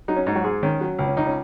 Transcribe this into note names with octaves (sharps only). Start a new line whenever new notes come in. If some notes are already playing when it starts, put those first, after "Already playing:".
F#3 D#4
C#4
G#2 D#4
F#3 F#4
G#2 G#3 G#4
D#3 C#4
F#3
C#2
C#4
C#2 D#4
C#4